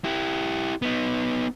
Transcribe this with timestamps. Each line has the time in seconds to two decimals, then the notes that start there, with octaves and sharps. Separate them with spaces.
0.05 E4 G4
0.82 B3 D#4